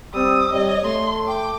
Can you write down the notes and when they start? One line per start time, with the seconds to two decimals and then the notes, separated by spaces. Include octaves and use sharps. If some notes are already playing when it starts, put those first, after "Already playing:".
0.14 G3 C4 D#6 E6
0.52 C3 G3 C#5 D#5
0.85 A3 C6
1.28 G5 D6